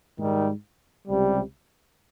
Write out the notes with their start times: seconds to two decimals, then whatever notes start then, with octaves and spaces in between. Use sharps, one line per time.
0.18 G#2 D#3 G3
1.08 C#2 C3 G3